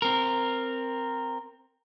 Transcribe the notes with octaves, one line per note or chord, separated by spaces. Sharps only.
C4 A#4